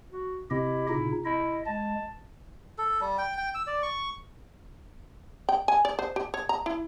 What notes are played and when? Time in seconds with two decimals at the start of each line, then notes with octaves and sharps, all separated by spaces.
0.12 F#4
0.51 C3 E4 G4 D#5
0.89 A#2 C#3 D#4
1.25 E4 D#5
1.66 G#3 A5
2.78 A4
3.01 G3
3.18 G5
3.38 G5
3.55 E6
3.67 D5
3.83 C#6
5.49 G5
5.68 G#5
5.85 D5
5.99 C5
6.16 G4
6.34 C#5
6.49 A#5
6.66 E4